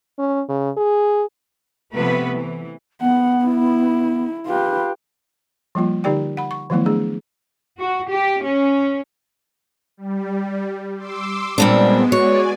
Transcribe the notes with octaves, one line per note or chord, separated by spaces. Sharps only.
C#4
C#3
G#4
C3 F3 A3 B3 B4
E3
B3 F#5
E4
F4 G4 B4
F3 G3 A#3 F4
D3 D#4 G4 D5 G5
F#5 B5
C#6
D#3 F3 F#3 A3 B3 E4
A3 D4 G#4
F#4
G4
C#4
G3
C6 D6 E6
A#2 G3 G#3 B3 C4 D4
F#4 C#5 D5 G#5